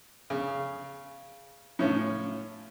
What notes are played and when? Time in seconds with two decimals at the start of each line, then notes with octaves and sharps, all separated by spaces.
0.30 C#3
1.79 A2 C#4 F4